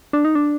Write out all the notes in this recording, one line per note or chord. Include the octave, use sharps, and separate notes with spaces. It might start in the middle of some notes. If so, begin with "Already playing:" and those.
D4
D#4
D4